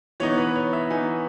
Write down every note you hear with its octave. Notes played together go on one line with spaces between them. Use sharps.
E3 B3 D#4 C#5
B4
C#5
E5
E3 B3 D#4 G#5